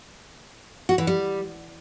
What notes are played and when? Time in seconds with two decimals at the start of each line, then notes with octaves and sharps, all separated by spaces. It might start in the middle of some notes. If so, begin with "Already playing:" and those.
0.89 F#4
0.98 E3
1.07 G3